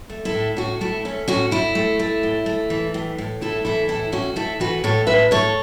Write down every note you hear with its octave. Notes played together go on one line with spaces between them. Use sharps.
A3
E4 A4
A2
A2 C#4 F#4
A3 E4
A3 C#4
A2 C#4 F#4
A2 E4
A3
A3
A2
A3
E3
A2
A2
A3 E4 A4
E3 E4 A4
A2 E4 A4
A2 C#4 F#4
A3 E4 A4
E3 F#4 B4
A2 A4 C#5
A2 B4 E5
A3 A4 C#5